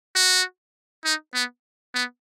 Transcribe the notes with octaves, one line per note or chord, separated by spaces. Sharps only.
F#4
D#4
B3
B3